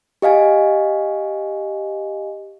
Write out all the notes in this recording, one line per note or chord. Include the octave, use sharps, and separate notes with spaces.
G4 D#5 F5 G#5